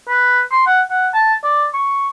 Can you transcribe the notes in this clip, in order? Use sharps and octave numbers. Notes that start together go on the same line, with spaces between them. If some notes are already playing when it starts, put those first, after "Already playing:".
B4
C6
F#5
F#5
A5
D5
C#6